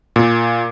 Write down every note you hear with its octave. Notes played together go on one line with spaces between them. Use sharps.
A#2